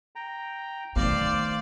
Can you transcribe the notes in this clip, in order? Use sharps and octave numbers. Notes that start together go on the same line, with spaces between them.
G5 A#5
D#3 A3 C5 D5 F5 C6